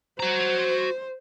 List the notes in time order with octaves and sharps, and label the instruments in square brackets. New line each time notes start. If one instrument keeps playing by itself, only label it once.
[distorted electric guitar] F#4 A#5 [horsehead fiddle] C5